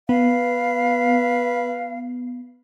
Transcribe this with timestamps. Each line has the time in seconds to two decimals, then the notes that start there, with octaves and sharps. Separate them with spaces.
0.09 B3 B4 F5